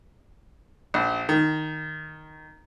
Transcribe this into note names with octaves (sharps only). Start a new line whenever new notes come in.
A#1
D#3